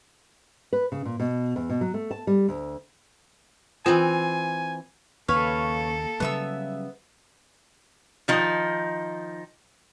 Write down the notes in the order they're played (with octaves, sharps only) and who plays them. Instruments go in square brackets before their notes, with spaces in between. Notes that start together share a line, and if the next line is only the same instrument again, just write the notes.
[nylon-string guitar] B4
C#3
A#2
B2
E2
B2
F#3
A3
A5
G3
D2
[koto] E3 C4 [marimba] F4 [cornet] G#5
[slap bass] D#2 C#3 [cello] A#3 A4 [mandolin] B4 C#5 F5
[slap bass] C#3 F#3 G3 [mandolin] B3 E5 E6
[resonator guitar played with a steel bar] D#3 F3 D#4